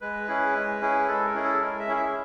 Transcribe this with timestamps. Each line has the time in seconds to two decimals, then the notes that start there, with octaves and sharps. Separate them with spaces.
0.01 G#3 B4
0.27 C#4 E4 G#4
0.54 G#3
0.81 C#4 E4 G#4
1.08 G#3 A4
1.25 A#4
1.34 C#4 E4 G#4
1.44 A4
1.61 G#3 A#4
1.79 E5
1.88 C#4 E4 G#4
1.96 E5